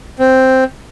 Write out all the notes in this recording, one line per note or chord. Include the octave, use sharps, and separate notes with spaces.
C4